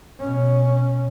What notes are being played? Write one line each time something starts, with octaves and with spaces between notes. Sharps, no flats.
B2 C#4